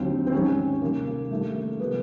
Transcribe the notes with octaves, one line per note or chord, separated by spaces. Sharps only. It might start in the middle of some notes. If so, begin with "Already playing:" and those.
Already playing: D#2 D3 F#3 C4
C4
G#2 D#3 G3 C#4
C2 C3 D#3 A#3
A#3
G2 D#3 G3 A3
A#3
C3 F3 G#3 B3